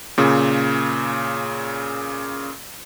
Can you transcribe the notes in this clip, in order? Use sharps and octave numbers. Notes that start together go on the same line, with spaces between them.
A#2 C#3